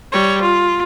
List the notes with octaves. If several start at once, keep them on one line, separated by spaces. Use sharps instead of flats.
G3 C#5
F4